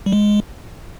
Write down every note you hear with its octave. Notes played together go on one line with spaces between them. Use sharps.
G3
G#3